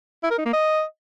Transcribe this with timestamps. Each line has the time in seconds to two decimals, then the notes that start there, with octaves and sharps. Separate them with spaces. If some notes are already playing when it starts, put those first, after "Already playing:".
0.23 E4
0.31 A#4
0.38 D#4
0.46 A#3
0.53 D#5